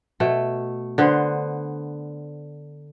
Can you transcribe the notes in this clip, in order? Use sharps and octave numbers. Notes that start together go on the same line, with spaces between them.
B2 A3
D3 B3 C5